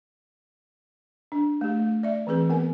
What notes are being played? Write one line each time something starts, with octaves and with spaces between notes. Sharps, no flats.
D4
A3 G4
A3
D5 E5
E3 C4 G#4 B4
B3 A#4 G#5